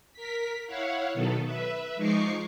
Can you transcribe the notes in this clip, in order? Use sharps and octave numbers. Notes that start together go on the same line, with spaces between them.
A#4 B6
E4 C#5 F5 F#5
B2 D#3 F#3 B3 A4
B4 E5
F3 G#3 D#4 C#6 D6 C7